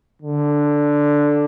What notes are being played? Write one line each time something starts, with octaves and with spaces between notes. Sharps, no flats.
D3